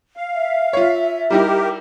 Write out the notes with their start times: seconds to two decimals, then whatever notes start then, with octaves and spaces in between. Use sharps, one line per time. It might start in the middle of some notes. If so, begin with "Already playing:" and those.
0.17 F5
0.32 E5
0.73 F4 C#5
1.30 G3 D#4 E4 G4 A#4